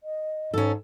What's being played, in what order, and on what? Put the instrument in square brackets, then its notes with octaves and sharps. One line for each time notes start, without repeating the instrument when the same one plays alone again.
[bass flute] D#5
[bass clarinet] G#2 [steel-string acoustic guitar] C#4 A4